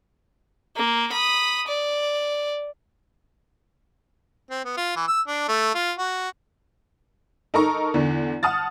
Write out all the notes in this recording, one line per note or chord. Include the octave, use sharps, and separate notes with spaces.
A#3
B5 D#6
D5
C4
B3
F4
E3
E6
D4
A3
F4
F#4
D#4 A4 A#4 A#5 C#6
E2 D3
F#5 A5 D#6 F6 A6